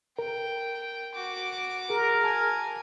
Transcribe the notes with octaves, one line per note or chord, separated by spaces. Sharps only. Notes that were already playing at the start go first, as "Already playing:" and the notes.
A#4 G5
F#4 D6
G#4 A#4
G#5 A5